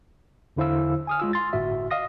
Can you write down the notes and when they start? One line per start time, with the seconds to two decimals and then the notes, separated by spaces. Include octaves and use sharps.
0.56 E2 D3 E4 C5 F5 E6
1.07 G#5 D#6 F6
1.20 G#3 F4 E6
1.33 C6 A6
1.53 G1 A2 F#4 E5
1.91 D#5 F5 D#6 A#6